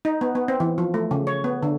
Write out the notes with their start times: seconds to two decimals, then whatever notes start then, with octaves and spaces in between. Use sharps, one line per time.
0.05 D#4
0.21 B3
0.35 B3
0.48 C4
0.60 E3
0.78 F3
0.94 A3
1.11 C#3
1.27 C#5
1.44 B3
1.63 D3